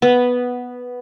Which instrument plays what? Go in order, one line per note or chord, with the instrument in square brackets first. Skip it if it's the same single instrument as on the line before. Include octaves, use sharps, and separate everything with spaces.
[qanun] B3